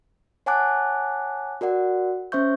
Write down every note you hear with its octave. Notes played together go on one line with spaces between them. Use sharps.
C#5 F#5 G#5 A5 D6 F#6
F#4 A#4 D5 F#5
C#4 C5 E5 C#6 G6